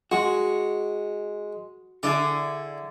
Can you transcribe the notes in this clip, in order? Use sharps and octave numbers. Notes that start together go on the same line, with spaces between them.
G#3 F#4
D3 E4 G#4 D5